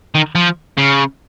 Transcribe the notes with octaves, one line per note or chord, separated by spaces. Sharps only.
D#3
F3
C#3